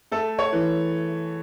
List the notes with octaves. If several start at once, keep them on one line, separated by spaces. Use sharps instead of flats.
A3 A4
C#5
E3